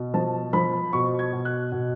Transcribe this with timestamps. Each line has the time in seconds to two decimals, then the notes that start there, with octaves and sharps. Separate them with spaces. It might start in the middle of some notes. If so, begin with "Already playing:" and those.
Already playing: B2
0.14 F3 A5
0.53 F3 B5
0.93 B2 C#6
1.19 G#6
1.33 B2
1.45 F#6
1.72 B2